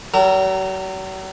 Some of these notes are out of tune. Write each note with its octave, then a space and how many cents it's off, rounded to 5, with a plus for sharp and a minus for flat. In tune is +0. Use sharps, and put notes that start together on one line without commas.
F#3 +45 A#4 -25